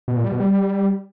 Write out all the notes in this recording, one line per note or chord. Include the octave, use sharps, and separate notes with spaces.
B2
A#2
G3
B2
G3